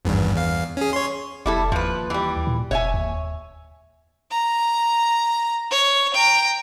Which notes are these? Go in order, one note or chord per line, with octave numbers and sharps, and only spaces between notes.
G#1 E2 G2
E2 F5
C#4 G#4
C#5 C6
F1 G3 E4 A4
D#2 F3 B4
E3 G3
A#2
F1 C#5 E5 G#5
D#2
A#5
C#5
G5 A#5